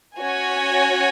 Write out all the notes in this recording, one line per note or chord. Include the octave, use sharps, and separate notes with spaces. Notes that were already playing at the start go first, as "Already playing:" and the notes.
C#4 F#4 C#5 G#5